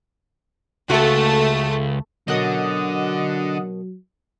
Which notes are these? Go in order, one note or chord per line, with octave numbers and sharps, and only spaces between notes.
C#2 A3 F#4 A4
B2 D3 F#3 C#4 A#4 D#5 F#5 D#6